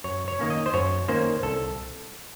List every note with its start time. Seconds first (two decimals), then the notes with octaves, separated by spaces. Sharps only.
0.04 F#2 C#5
0.28 C#5
0.39 D#3 A#3 C#4
0.50 D#5
0.66 C5
0.74 F#2 C#5
1.08 D#3 A#3 C#4 C5
1.43 C2 A4